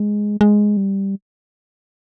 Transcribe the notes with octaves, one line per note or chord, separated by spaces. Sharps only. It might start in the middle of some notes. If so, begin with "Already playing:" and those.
Already playing: G#3
G#3
G3